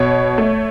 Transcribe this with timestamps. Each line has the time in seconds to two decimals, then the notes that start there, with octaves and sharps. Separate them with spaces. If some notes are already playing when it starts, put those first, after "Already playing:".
Already playing: B2 C#5
0.38 A3